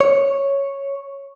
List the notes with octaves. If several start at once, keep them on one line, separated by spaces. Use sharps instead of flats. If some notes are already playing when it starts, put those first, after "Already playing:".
C#5